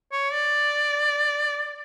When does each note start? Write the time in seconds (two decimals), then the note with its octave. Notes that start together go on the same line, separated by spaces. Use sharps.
0.12 C#5
0.33 D5